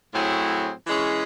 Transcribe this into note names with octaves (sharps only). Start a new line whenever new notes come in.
A2 F#3 C4 E4 G#4
E3 G#3 C#4 G#4